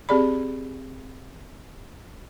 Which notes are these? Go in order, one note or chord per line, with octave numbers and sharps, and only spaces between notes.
C4 G4 G#4 D5 B5